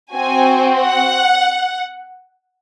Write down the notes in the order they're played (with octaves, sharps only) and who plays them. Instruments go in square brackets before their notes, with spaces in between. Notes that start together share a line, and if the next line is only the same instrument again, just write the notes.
[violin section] C4 F#4 G#5
F#5